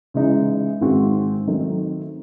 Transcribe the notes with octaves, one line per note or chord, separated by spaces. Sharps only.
C#3 E3 G#3 D#4
G#2 D#3 G#3 C4 F#4
D#3 F#3 A3 C4 D#4